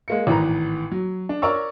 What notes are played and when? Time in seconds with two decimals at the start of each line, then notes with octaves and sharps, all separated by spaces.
0.08 G#3 A#3 C#7
0.27 G#1 A2 E3 B4 A#5
0.92 F#3
1.29 D4
1.42 A#4 C#5 D5 A#5 C#6 E6